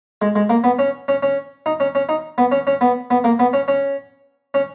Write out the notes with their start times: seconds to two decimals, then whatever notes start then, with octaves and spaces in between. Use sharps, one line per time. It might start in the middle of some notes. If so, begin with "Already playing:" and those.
0.22 G#3
0.36 G#3
0.50 A#3
0.64 B3
0.79 C#4
1.08 C#4
1.23 C#4
1.66 D#4
1.80 C#4
1.95 C#4
2.09 D#4
2.38 B3
2.52 C#4
2.67 C#4
2.81 B3
3.11 B3
3.24 A#3
3.39 B3
3.53 C#4
3.68 C#4
4.54 C#4